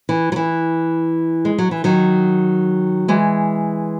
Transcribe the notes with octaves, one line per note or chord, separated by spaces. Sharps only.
E3
F#3
E3
G#3
F#3
E3
D#3 F#3
E3 G#3